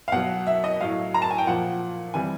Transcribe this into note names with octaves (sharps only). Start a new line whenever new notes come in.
F5
B2 F#3 F#5
E5
D#5
A2 F#3 F5
A#5
A5
G#5
G5
A#2 F3 F#5
C3 E3 G3 G#5